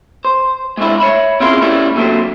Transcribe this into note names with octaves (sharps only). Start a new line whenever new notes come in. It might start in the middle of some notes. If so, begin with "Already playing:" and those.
C5
G#3 A3 C4 D4 E4
C#5 E5 B5
C4 C#4 E4 F4 G#4 A#4
G3 A3 C#4 E4
A#2 D3 F#3 A3 C4